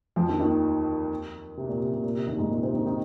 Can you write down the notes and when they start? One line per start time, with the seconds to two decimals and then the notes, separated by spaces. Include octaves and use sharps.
0.16 F2 F3
0.28 D#2 D#3
0.40 D#2 D#3
1.57 C3
1.69 A#2
1.81 C3
1.93 C3
2.04 A#2
2.16 C3
2.27 D#2 D#3
2.38 G#2 G#3
2.51 A#2 A#3
2.63 C3 C4
2.74 D#3 D#4
2.86 D#3 D#4